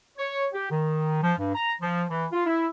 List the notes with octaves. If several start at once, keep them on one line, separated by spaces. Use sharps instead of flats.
C#5
G4
D#3
F3
G2
A#5
F3
E3
F4
E4